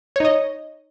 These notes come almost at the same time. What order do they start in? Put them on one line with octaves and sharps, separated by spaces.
C#5 D#4 D#5